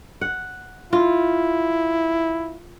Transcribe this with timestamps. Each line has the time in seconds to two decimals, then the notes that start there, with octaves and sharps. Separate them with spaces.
0.21 F#5
0.93 E4 F4